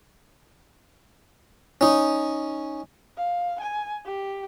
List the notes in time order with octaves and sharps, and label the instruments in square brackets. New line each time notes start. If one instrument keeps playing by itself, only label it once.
[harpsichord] C#4 D#4
[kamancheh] F5
G#5
G4